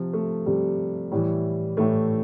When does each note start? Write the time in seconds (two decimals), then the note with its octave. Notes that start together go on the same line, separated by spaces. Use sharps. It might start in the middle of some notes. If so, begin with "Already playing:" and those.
Already playing: C3 F3
0.13 A3
0.46 C3 F3 G3
1.11 A2 E3 G3
1.77 A2 E3 A3